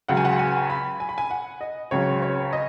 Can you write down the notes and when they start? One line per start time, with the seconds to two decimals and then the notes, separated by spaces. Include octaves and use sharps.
0.08 C#2 C#3 F#3 F#5
0.17 G#5
0.25 F#5
0.39 G#5
0.70 B5
1.00 G#5
1.09 B5
1.18 G#5
1.31 F#5
1.61 D#5
1.91 C#2 C#3 F#3 C#5
2.22 C#5
2.53 D#5